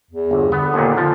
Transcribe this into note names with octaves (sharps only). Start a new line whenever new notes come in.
E2
G1
D3 B3
D#2 A#2
F2 D3 F3